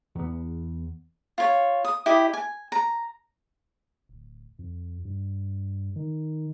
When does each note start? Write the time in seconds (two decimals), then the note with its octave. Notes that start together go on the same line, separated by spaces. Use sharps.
0.15 E2 B3
1.38 F4 C#5
1.85 D#6
2.06 E4 G4 D#5
2.33 G#5
2.72 A#5
4.09 D1
4.59 F2
5.05 G2
5.96 D#3